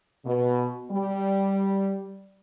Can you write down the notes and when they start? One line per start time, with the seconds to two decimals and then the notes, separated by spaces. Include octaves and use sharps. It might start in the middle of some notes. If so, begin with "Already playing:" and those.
0.25 B2
0.90 G3